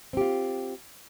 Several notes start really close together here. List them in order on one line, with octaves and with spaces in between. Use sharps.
C4 G4 F4